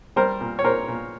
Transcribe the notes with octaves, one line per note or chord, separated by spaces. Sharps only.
G3 A#4 C5
A#2
C#5
A#2 A#4 C5
A#2